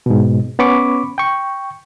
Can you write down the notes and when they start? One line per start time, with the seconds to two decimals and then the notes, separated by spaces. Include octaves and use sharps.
0.06 G#2 B2
0.59 B3 C#4 B5 C#6 D6
1.18 G5 C#6